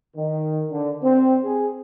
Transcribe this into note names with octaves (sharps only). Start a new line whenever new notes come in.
D#3
D3
C4
G#4